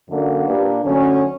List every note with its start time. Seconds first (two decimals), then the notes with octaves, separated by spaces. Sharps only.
0.09 F#2 D3 A#3 D4
0.47 A#2 A#3 D4 G4 B4
0.84 D2 D3 F#3 C#4